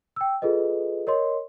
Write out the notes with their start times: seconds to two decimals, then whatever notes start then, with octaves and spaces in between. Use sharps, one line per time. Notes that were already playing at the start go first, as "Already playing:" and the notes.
0.16 G5 E6
0.42 F4 G#4 A4 B4 D#5
1.07 A#4 C#5 D#5 C6